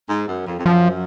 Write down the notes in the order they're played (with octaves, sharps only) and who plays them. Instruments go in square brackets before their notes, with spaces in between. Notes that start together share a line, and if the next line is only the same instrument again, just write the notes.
[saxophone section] G#2
F#2
F2
F2
[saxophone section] F#2 [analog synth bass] F3